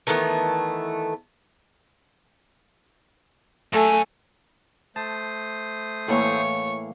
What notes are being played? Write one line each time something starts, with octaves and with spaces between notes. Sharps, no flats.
D#3 E3 A3 B3
F#2 A3 A4 G#5
A3 C5 A5 D#6
A2 E3 A#3 C#5 F5